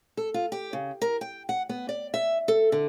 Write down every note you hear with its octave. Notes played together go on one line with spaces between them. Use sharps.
A4
F4
G4
C#3
A#4
G5
F#5
B3
D5
E5
A4
D3